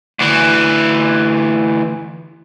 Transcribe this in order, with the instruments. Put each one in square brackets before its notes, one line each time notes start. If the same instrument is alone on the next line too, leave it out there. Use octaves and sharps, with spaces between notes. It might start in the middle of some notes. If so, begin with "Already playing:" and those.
[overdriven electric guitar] D2 E3